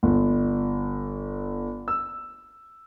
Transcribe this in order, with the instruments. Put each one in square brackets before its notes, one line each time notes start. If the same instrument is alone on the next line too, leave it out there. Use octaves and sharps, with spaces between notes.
[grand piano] G1
E6